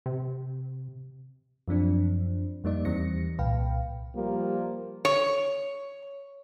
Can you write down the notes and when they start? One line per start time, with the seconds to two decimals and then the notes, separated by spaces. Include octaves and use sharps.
0.06 C3
1.68 F#2 F3 C4 D4
2.64 F2 G3 A#3 D#4 D5
2.85 E2 E3 G3 C4 A#6 C#7
3.39 C2 A#2 B4 F5 G5
4.16 F3 G3 A#3
5.05 C#5